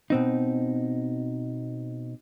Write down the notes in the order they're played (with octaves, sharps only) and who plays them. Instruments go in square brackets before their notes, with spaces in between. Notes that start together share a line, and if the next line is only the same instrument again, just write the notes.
[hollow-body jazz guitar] B2 C4 D#4